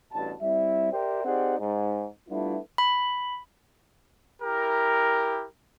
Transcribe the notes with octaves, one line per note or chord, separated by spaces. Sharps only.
A1 G2 B2 A5
G3 C4 E4 E5
G4 A#4 C5 D5 E5 G5
C4 D#4 G4 G#4 D5 F#5
G#2
G3 A3 B3 D4 E4 F4
B5
E4 G4 A#4